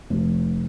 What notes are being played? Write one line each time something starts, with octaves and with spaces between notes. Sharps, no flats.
F1